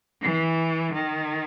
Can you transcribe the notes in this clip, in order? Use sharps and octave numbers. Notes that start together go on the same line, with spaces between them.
E3
D#3